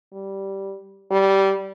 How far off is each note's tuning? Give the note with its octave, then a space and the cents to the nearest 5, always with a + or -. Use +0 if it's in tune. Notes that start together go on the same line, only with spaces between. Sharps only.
G3 -10
G3 -15